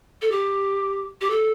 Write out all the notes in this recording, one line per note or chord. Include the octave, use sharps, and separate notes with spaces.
A4
G4
G4
A4